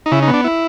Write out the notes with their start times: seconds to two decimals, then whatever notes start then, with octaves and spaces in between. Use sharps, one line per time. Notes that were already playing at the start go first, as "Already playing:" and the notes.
0.06 D#4
0.12 C#3 E4
0.22 D#4
0.28 B3
0.33 D4
0.44 E4